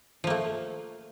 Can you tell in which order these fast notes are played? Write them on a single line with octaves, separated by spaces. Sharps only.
F3 A#3 A3